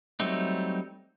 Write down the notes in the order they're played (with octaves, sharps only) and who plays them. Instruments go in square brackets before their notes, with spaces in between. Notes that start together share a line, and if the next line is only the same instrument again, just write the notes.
[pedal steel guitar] F#3 G3 A3 C4 D#4